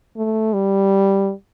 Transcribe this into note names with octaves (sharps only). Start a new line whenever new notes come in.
A3
G3